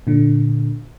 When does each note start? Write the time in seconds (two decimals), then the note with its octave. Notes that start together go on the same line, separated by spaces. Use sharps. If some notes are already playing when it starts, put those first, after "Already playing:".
0.07 A#2 D3